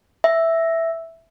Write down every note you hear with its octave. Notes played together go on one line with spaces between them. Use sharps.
E5